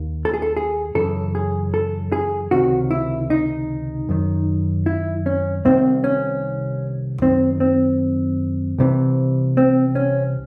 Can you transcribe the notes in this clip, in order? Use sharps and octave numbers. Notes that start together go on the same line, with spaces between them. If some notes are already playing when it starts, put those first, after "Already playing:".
Already playing: D#2 D#3
A4
G#4
A4
G#4
F#2 C#3 E3 A4
G#4
A4
G#4
C#2 C3 D#3 F#4
E4
D#4
F#2 D#3
E4
C#4
C2 C3 D#3 C4
C#4
F#2 D#3 C4
C4
C2 C3 E3
C4
C#4